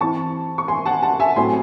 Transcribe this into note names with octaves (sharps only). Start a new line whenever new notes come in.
E3 C4 E4 A5 C#6
C#6
G#5 C6
F#5 A5
F#5 A5
E5 G#5
A2 F#3 C4 G#5 C6